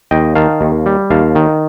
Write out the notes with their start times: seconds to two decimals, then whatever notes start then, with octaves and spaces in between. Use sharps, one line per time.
0.11 D#2 D#5 G5
0.35 D#3 F5 A5
0.61 D#2
0.86 G3
1.10 D#2 F5 A5
1.35 D#3